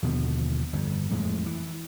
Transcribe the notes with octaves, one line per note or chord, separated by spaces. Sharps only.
D#2 B2 D3 F3
G1 F2
F2 A2 G#3
E3